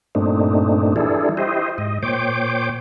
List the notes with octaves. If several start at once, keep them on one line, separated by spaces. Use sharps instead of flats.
G2 A#2 A3 C4 D4 D#4
E3 G3 D4 E4 G#4 A4
E4 G4 C5 D#5
G#2 D#5
A#2 C5 C#5 G5 D6